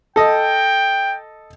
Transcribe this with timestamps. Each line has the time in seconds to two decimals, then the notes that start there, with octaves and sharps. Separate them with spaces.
0.16 A4 D#5 G5